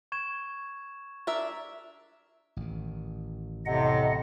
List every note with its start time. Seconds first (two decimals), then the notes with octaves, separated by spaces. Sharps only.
0.12 C#6 G#6 E7
1.27 D4 A#4 E5
2.57 A1 D#3
3.66 F2 A2 C3 D#5 F#5